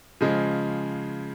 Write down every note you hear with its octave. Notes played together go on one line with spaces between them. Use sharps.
C#3 F3 G#3